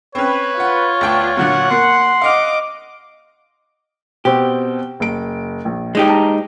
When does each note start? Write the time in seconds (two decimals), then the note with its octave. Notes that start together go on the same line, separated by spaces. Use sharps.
0.15 C4 C#4 B4 C#5
0.60 F4 F#5
1.01 D2 B3 D4 G5 C#6
1.37 A#2 D3 F#3 F#5
1.71 A#3 C6
2.21 D#5 F5 F#5 D6 F6
4.25 B2 C4 G4
5.00 F#1 D7
5.65 A#1
5.95 G#3 D#4 G4
6.08 A5 A#5